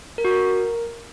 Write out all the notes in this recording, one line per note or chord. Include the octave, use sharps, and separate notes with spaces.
A#4
F#4
A#4